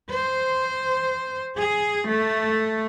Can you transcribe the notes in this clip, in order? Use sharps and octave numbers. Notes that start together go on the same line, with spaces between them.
C5
G#4
A3